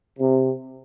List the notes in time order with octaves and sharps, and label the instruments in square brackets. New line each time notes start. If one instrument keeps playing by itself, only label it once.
[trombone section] C3